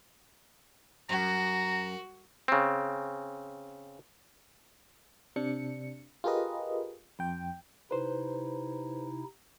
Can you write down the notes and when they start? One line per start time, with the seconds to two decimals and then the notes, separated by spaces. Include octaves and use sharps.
1.09 F#2 F#4 A#5
2.48 C#3 C4
5.36 C3 D4 C#7
6.24 F4 G4 G#4 A#4 B4 D#5
7.19 F2 G5
7.91 C3 D#4 E4 B4 C5